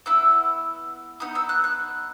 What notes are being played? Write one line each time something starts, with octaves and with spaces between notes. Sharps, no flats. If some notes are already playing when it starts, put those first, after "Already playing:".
B3 E4 E6
B3 D#4 D#6
E6
F#6
F#6